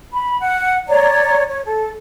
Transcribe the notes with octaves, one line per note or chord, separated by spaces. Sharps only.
B5
F#5
C#5 D5 A#5
C#5
A4